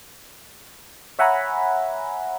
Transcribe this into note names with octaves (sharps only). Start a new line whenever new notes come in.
C#5 E5 F#5 G#5 A#5 B5